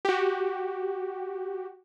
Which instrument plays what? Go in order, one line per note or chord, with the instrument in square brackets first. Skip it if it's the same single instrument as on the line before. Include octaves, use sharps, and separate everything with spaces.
[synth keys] F#4 G4